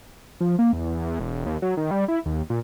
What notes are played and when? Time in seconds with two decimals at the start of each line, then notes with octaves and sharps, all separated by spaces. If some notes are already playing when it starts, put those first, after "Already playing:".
0.41 F3
0.59 A#3
0.73 E2
1.19 E1
1.46 D#2
1.62 F#3
1.77 D#3
1.91 G3
2.08 E4
2.26 D#2
2.50 A#2